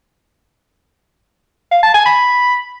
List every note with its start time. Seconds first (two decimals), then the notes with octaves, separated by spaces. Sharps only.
1.71 F5
1.83 A5
1.94 G#5
2.06 B5